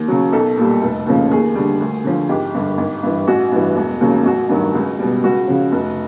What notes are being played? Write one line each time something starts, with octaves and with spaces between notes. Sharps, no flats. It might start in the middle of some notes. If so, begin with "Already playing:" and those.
Already playing: D#2
C#3 F#3
B1 A4
A#2 G3
F1
D#2 C#3 F3
D#2 G#4
D3 G3
D2
D3 F3
G#1 G4
G2 D3
G#1
G2 E3
A1 F#4
G2 E3
E1
D#2 C#3 F#3
A1 F#4
G2 D#3 F#3
C#2
B2 G3
C#2 F#4
C#3 F3
F1